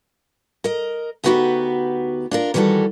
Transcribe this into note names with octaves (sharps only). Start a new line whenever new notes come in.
A#4 D#5
D2 B3 D#4 F#4 G4 B4
D4 F4 A#4
D#3 E3 G3 B3 F#4 A4